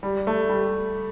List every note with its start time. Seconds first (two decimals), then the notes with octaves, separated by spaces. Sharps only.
0.03 G3
0.27 A3
0.49 G3